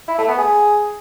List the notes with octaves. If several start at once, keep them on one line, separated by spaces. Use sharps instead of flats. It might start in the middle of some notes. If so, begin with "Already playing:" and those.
E4
A3
B3
G#4